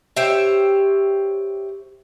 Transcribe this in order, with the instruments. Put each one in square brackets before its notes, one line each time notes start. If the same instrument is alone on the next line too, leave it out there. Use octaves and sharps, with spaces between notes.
[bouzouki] G4 C5 C#5 E5